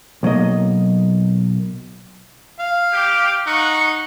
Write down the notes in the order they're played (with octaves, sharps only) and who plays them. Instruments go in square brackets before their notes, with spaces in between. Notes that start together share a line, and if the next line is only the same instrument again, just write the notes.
[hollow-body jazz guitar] B1 F#3 A#3 D#5
[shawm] F5
[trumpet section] G4
[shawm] D#4 [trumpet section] F#5 C#6